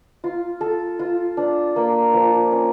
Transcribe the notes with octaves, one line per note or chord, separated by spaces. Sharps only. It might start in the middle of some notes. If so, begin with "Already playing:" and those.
F4
A4
F4
D4
A#3
F3
C#4